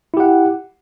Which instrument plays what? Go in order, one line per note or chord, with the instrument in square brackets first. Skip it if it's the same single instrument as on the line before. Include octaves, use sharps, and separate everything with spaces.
[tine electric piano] E4
G4
F#5